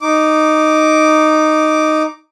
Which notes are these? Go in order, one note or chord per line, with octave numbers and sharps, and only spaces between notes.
D#4 D6